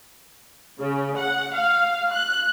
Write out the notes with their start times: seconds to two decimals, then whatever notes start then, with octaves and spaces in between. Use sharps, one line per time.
0.79 C#3
1.17 F#5
1.52 F5
2.11 F#6